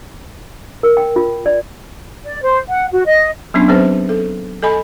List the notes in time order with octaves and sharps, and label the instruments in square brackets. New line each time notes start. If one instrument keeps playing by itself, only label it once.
[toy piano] A#4
G5
F4
D5
[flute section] D5
C5
F#5
F#4
D#5
[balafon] F#3 B3 C#4 D4
F#3 C4 G#4 B4 C5
A4
A4 D#5 G#5 B5